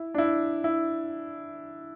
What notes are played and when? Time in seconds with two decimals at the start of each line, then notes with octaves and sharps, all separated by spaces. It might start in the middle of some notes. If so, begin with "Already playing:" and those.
Already playing: E4
0.14 D4
0.18 E4
0.64 E4